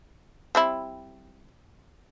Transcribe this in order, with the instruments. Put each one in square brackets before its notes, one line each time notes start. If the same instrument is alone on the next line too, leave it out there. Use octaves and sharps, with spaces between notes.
[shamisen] G3 C4 E4